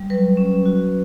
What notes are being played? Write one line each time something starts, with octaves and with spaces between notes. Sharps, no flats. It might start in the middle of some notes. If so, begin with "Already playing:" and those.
Already playing: G3
F#3 B4
C#4
F#4